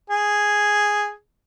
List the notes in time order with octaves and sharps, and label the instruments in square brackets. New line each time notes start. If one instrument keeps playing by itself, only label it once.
[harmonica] G#4